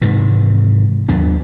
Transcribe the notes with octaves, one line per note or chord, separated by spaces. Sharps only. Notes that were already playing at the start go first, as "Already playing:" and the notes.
G#2 C3 D#3 E3
D#2 F#3 B3 D4